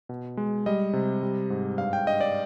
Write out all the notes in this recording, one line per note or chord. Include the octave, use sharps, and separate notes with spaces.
B2
G#3
G3 D#5
C3
G3
G#2
G2 F5
G5
G2 D#5
D5